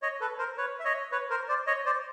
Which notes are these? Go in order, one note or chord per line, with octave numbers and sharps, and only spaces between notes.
C#5 D#5
A4 B4
A#4 C5
B4 C#5
E5
C#5 D#5
B4 C#5
A#4 C5
C5 D5
C#5 D#5
C5 D5